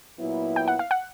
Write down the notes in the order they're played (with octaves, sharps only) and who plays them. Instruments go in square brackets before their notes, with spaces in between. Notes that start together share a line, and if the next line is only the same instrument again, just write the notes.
[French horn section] A#2 F#3 B3 E4
[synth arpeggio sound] G5
F#5
F5
F#5